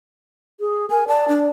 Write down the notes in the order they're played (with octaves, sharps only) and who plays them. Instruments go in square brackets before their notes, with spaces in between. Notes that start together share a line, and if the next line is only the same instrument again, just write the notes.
[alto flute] G#4
[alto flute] A#4 [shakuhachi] G#5
[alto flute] D5 [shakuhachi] A5
[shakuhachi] D4